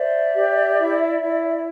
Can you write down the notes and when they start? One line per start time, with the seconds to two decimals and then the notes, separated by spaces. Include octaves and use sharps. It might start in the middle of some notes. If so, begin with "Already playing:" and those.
Already playing: C5 D5 E5
0.35 G4
0.78 E4
1.21 E4